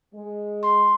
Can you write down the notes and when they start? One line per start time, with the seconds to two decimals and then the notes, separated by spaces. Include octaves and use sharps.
0.15 G#3
0.63 C6